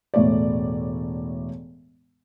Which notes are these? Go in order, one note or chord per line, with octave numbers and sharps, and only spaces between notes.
E1 A2 A3 C#5 D5